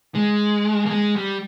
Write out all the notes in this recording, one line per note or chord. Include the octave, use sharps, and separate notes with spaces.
G#3
A#3
G#3
G3